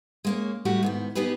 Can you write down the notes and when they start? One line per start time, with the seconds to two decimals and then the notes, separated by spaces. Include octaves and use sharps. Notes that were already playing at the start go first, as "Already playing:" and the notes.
0.25 G#3 A#3 C#4
0.65 A2 G3 A3 F#4 G4
0.83 G#2 D#3 B3
1.15 B3 D#4 G4 G#4 B4